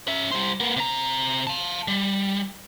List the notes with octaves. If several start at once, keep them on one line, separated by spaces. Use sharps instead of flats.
C#4 E5
G3 C5
A#3 B3
C3 A#5
F5 A5
G3